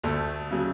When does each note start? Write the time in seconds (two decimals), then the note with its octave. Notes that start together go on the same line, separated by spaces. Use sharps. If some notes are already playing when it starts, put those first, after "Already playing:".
0.04 D2 A3
0.51 C#3 F#3